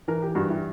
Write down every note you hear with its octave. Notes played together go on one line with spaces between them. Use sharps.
E3 A#4
G4
G2 F#4
E4 G4